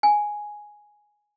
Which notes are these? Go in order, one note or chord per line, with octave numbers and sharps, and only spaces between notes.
G#5